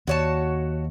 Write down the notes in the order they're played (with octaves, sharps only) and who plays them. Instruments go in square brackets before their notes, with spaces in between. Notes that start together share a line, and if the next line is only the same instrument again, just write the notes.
[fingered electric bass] D#2 [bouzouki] F#4 C#5 A5